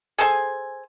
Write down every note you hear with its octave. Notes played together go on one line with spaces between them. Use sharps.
G#4 A4 C5 G#5